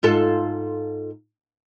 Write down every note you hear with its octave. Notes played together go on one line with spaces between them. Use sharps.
G#2 F4 A4